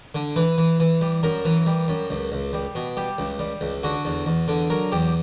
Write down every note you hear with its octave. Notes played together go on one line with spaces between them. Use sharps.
D3
E3 B4
E3
E3
G3
F#2 A#4
E3
G3
F#2
C#2
C#2
G3
B2
G3 G4
C#2
G3
C#2
D3 F#4
E2
E2
D3
F#3 A#4
E2 G4